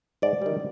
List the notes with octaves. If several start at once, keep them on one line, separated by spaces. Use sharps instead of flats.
G#2 D5
D#3 G3